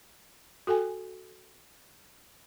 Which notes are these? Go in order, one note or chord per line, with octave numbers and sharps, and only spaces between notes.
F#4 A4 G5 G#5